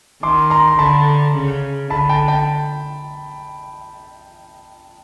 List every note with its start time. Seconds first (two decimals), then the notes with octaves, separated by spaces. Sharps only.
0.23 D#3 C6 D6
0.50 A#5 C6
0.68 C6
0.79 D3 A5 B5
1.35 C#3
1.90 D3 A5 B5
2.09 G5 A5
2.28 G5 A5